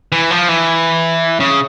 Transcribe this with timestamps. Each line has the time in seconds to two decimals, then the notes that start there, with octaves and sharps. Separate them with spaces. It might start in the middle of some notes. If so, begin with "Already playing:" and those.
0.12 E3
0.31 F3
0.49 E3
1.40 C#3